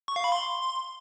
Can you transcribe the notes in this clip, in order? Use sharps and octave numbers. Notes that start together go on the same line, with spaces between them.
C#6
F5
B5
C6